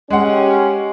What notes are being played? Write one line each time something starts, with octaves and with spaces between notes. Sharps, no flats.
G#3 C#4 G4 F#5